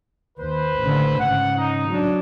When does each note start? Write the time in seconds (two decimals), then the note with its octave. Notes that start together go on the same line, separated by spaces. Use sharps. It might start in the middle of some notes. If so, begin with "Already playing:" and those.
0.38 D#2 B4 C5
0.79 A1 D3
1.19 G#2 C#3 F#5
1.57 D#4
1.89 F#3 D4